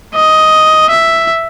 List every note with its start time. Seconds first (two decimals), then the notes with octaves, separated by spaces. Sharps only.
0.15 D#5
0.90 E5